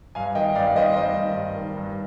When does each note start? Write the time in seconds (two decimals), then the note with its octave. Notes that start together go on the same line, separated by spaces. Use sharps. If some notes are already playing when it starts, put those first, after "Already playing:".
0.15 G2 F5 G#5
0.35 D#3 D#5 G5
0.55 G2 D5 F5
0.75 D#3 C5 D#5
0.96 G2 C5 D#5
1.16 D#3
1.36 G2
1.56 D#3
1.77 G2